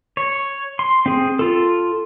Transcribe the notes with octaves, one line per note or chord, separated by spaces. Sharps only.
C#5
C6
C4 G#4
F4 A4